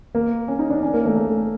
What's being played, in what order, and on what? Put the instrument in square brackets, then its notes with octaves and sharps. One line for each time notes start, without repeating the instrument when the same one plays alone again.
[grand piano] A#3
C#4
D#4
D4
C#4
A#3
A3
A3